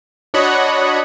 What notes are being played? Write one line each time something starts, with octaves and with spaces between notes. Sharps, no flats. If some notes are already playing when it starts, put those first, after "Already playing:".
D4 F#4 C#5 D#5 F#5 B5